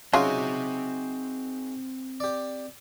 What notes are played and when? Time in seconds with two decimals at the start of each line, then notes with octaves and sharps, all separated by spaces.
0.13 F#3 C4 C#4 D#4 F4 F#4 G#4 E5
2.20 G4 D5